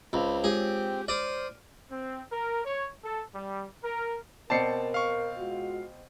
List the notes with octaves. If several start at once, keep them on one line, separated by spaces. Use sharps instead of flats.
C#2 C4 B5 E6 F7
G#3 F4 G4 G#4 C#5
C5 D5 D#6 F6
C4
A#4
C#5
A4
G3
A#4
B2 C4 A#4 D5 A5 C7 C#7
F5 C#6
G#3 F4 F#4